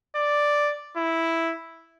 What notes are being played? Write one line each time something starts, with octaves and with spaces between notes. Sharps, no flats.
D5
E4